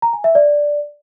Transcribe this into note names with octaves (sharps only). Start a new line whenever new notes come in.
A#5
G#5
E5
D5